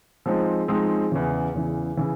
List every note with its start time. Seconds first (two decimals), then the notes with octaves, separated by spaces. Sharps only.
0.26 F3 G#3 C4 D#4
0.68 F3 G#3 C4 D#4
1.12 E2 C#3 E3
1.54 E2 C#3 E3
1.97 C#3 E3